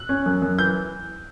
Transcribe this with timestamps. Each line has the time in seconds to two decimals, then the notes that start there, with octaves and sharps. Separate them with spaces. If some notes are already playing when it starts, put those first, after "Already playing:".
Already playing: F#6
0.09 C#4
0.26 F#2
0.42 F#2
0.59 E3 G6